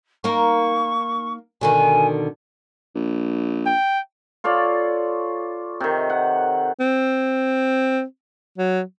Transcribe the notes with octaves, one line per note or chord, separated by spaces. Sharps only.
A#3 D#4 A#4 C#6
B2 D3 D#3 G#5
A#1
G5
F4 A4 C#5 D5
C3 D#3
F#5
C4
F#3